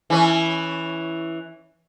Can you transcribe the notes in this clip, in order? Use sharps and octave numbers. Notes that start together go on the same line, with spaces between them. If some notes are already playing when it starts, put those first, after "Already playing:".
E3 C#4